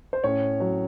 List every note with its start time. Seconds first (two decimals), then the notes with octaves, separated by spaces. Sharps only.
0.13 C5
0.24 A2 C#4 C#5
0.60 F#3